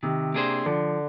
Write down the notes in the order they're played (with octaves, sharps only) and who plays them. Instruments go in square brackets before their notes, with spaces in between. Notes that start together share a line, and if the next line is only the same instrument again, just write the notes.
[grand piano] C3 [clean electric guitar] D#3
[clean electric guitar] A#3 D4 G#4 C5
[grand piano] D3 [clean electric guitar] F3